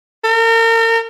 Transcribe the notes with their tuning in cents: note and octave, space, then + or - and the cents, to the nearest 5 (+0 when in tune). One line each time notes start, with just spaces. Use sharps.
A#4 -40